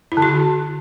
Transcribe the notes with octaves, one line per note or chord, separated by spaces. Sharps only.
E4
D3
F#4